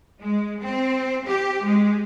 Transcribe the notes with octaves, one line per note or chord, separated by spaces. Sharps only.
G#3
C4
G4
G#3